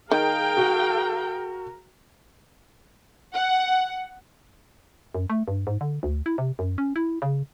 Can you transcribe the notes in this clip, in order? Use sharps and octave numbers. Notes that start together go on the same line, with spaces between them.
D#3 G#4 A#4 F5 G5
F#4
F#5
F#2
A3
G2
G#2
D3
D2
E4
C3
F#2
C#4
E4
C#3